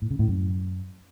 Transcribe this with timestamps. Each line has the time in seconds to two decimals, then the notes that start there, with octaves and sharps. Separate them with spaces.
0.02 A2
0.11 C#3
0.19 A2
0.28 F#2